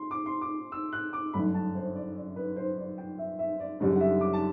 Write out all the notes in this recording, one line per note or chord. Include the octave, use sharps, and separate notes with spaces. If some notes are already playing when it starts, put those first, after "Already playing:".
Already playing: C6
D6
C6
D6
E6
F#6
D6
G1 F#2 D3 A3 B5
A5
C5
D5
D5
B4
C5
D5
G5
E5
E5
D5
F#1 F#2 D3 G3 D5
F#5
E5
D6
A5